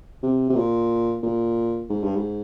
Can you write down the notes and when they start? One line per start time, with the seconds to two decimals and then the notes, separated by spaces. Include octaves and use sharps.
0.23 C3
0.50 C3
0.56 A#2
1.23 A#2
1.90 G#2
2.03 G2
2.16 G#2